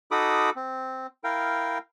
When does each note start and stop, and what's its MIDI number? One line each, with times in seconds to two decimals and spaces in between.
0.11 0.50 63
0.11 0.50 66
0.11 0.50 69
0.11 0.50 83
0.11 0.50 86
0.11 0.50 87
0.56 1.07 60
1.24 1.78 64
1.24 1.78 70
1.24 1.78 77
1.24 1.78 79